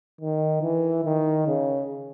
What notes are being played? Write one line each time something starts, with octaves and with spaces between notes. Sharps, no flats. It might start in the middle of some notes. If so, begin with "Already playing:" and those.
D#3
E3
D#3
C#3